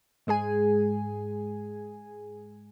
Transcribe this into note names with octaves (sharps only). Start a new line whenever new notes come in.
G#2 G#3 G#4 G#5